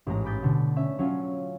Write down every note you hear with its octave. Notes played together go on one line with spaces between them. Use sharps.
A1 G#2 G#3 A#5
B5 D6 D#6 G6 A6 B6
B2 D3
C#4 E5
F#3 C#4 F4